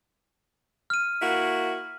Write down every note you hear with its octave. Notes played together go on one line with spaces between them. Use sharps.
F6 D#7
A#3 E4 F#4